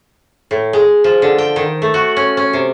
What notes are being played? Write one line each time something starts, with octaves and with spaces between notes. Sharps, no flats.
A2
G#3
F3
D3
G5
D#3
A3
F#4
C#4
C#4
C3